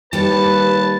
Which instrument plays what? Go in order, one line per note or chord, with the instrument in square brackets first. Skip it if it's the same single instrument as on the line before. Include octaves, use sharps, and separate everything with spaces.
[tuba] D#2 [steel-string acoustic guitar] G3 A4 [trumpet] B4 [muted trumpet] A5